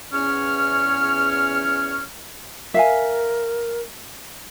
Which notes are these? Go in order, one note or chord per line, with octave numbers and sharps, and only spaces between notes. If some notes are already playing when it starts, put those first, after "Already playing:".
E2 C#4 C#5 F6
A#4 E5 F5 G#5